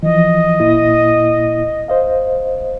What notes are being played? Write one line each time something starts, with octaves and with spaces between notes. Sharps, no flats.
E3 F3 D#5
A#2 A#3 E4
C5 D#5 F5